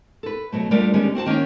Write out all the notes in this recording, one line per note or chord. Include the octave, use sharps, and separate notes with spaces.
A4 B4
B2 F#3 A3
G3 A3 D4 F4 A#4 D5
D3 D#3 G3 G#3 B3 C#4
C4 F#4 F#5 A5
D#3 A#3 C#4